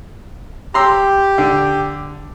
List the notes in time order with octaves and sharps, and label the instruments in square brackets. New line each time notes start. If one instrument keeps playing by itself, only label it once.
[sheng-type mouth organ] G4 [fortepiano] A#5 C6 E6
[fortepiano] D3